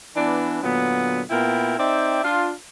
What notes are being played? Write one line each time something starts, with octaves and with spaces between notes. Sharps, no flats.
E3 B3 D4
A#2 D3 F#3 B3
A#2 B3 E4 A#4 G5
C4 D#4 D5 E5 G5
D4 F4